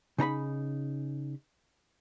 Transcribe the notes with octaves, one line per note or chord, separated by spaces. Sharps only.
C#3 D#4 A#5 B5